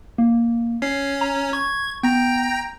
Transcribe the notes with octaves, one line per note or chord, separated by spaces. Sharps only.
A#3
C#4 C7
A#5
C#6 G#6
B3 G5 A#5